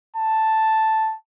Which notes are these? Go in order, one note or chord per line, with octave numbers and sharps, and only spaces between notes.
A5